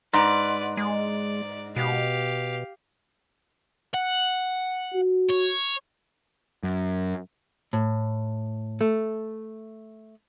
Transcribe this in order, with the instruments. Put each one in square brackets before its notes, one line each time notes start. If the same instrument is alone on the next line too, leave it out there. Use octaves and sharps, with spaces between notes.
[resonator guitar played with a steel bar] G#2 [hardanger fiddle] B4 D5
[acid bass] G#3 [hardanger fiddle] D5
[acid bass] B2 [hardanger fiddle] G4 F5
[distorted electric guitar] F#5
[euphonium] F#4
[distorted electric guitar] C#5
[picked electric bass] F#2
[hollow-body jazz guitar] A2
A3